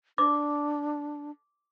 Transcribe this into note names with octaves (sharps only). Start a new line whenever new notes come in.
D4 D6